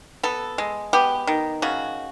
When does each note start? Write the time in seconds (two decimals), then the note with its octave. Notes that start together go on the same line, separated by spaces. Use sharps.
0.23 B3 A4
0.58 G#3
0.93 B3 G4
1.27 D#3
1.62 C#3 F#4